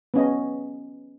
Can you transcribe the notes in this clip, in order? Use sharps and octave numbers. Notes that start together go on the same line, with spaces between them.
B3 C#4 D#5